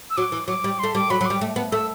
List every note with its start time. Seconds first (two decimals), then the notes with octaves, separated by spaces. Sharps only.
0.10 E6
0.17 F#3 D6
0.32 E3
0.48 F#3 D6
0.64 G3
0.79 A3 C6
0.95 G3 D6
1.10 F#3 B5
1.21 F#3
1.26 G3 D6
1.41 A3
1.56 B3
1.72 A3 E6